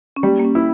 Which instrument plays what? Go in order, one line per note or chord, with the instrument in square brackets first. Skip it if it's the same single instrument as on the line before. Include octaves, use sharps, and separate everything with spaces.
[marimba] C#4
[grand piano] G3 [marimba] A#3
[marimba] A#3
C#4
[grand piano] E4